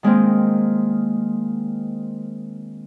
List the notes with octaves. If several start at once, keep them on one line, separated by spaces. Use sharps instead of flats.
D#3 G#3 A#3 C4